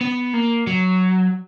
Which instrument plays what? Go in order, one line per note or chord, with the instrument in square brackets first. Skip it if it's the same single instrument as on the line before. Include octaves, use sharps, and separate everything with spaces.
[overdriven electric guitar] B3
A#3
F#3